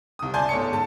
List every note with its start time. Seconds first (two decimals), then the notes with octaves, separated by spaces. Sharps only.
0.19 C2 D#6
0.34 D5 G#5 A5 C6 G6 G#6
0.49 G1 G#2 C#5 A5 C#7
0.72 G#2 A5